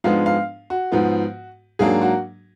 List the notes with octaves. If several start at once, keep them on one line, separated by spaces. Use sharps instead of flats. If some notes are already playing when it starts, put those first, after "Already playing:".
G#2 F3 G#3 B3 D4 F5
F5
F#4
G#2 F3 B3
G#2 F#3 A#3 D4 G#4
F#4